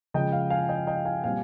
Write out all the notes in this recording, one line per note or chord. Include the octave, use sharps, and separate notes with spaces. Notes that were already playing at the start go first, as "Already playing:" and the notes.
C#3 F3 G#3 C#4 D#5 G5
F5
F5 G#5
D#5 G5
D#5 G5
F5 G#5
A#2 G3 C4 F5 G#5